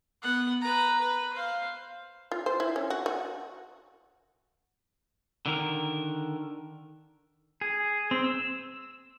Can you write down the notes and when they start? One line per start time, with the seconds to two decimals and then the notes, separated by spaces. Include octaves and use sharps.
0.22 B3 F#5
0.61 B4 A#5
1.00 B4
1.33 C5 F5
2.31 F4
2.46 C5
2.60 E4
2.76 C#4
2.90 F#4
3.06 F#4
5.46 D3 D#3 A#4
7.61 G#4
8.11 C4
8.24 E6